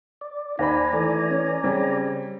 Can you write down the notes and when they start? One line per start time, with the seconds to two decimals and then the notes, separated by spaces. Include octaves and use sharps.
0.21 D5
0.59 D#2 D#4 C5 D5 G#5 A#5 B5
0.93 E3 A3
1.31 C#4
1.64 C#3 G3 C4